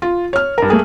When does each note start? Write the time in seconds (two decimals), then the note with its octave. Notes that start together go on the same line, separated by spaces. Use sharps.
0.02 F4
0.33 C#5 F6
0.58 G2 A#4
0.70 A3 A#3 G#4